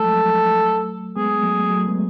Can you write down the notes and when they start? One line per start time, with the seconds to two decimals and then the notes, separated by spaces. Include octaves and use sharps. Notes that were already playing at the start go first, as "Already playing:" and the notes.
Already playing: F3 F#3 G#3 A3 A4
1.16 G#3 B3 G#4
1.43 F#3 A3
1.70 F#3 A3
1.88 G#3 B3